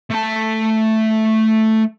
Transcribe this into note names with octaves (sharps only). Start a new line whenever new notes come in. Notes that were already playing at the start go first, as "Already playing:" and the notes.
A3 A5